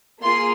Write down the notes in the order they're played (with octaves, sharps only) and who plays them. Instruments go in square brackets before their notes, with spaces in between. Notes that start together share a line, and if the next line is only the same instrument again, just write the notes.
[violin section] A#3 F4 G#4 C6